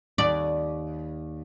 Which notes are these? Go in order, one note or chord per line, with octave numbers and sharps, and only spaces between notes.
D#2 D5